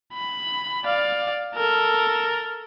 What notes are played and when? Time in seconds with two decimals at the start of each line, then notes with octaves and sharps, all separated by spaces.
0.13 B5
0.85 D5 F5
1.55 A4 A#4